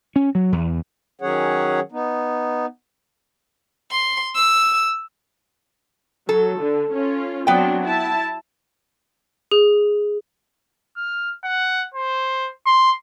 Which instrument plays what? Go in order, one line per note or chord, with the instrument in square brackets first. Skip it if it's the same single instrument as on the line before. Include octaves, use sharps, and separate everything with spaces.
[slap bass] C#4
F#3
E2
[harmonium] D#3 F#3 C#4 G#4 C#5 F#5
B3 D#4
[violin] C6
E6
[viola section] F#3 [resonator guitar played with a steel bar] A4
[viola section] D3
C#4 F4
[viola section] F#3 C4 D4 [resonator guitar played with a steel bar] B3 G5
[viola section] E4 A5
[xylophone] G#4
[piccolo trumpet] F6
F#5
C5
C6